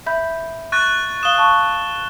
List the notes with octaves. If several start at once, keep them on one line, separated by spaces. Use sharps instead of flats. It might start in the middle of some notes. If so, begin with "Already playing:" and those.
E5 B5 G6
C#6 F#6 A6
F5 D#6 E7 G7
A5 C#6